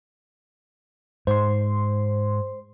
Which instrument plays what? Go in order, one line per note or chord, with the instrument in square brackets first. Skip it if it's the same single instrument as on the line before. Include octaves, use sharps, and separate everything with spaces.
[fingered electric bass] G#2 [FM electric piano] C5 C6